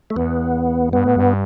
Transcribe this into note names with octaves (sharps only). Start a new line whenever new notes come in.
A3
E2 B3
G2 B3
A2
G2